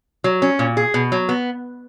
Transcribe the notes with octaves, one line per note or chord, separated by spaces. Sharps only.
F#3
C#4
A#2
G#4
B2
F#3
B3